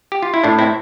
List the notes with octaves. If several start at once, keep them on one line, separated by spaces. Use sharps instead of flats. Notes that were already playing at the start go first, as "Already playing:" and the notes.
G4
F4
E4
A2 D4
C4 E4